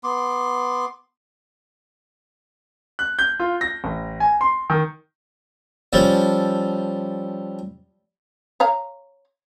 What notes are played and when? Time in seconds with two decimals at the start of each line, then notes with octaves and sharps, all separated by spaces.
0.04 B3 C6 D6
2.99 F#6
3.19 G6
3.40 F4
3.61 A#6
3.84 A1
4.20 G#5
4.41 C6
4.70 D#3
5.93 F3 G3 C#4 A4
8.60 C#5 F5 A#5